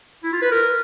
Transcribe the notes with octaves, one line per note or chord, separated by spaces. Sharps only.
E4
F4
B4
A#4